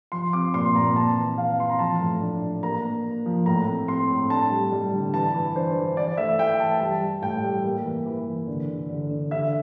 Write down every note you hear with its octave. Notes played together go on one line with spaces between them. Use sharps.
F3 C6
C4 D6
A#2 C6
A#2 A#5
C4 A5
E3
C4 F5
E3 C6
A#5
F3 A5
A2
D4
D4
A#3 A#5
A#3
A#3
F3
A2 A#5
C4
C4 C6
A2
D4 A5
G3
G3
D3
E3 A5
E3
D4 C5
E3
E3 D5
A3 E5
E3 G5
A3 A5
G3 A5
G3
A2 G5
G3
A#3
E3
E3
E3
D3
D3
D3
D3
D3 E5